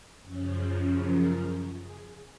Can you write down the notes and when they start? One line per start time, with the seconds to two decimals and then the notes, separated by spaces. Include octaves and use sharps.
0.22 F#2 C#3 F3 C#4
1.00 A#4
1.79 G#4